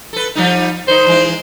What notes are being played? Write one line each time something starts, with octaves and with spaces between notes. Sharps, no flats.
A4 B4
F3 G3 D#4
D#3 D#4 C5
E3 G#3